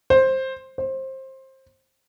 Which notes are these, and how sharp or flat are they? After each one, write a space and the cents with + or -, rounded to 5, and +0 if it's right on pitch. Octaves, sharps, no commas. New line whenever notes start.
C5 +10
C5 +20